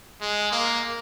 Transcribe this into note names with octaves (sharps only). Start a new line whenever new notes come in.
G#3
A#3